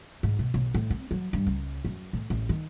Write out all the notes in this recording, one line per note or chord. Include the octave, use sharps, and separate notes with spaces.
G#2
B2
B1
A2
C4
F#3
G2
C#2
F#2
A2
A1
D#3